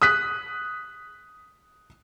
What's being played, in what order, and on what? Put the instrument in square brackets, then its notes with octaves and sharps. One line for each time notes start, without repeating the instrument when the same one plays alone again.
[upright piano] D#6 F#6 B6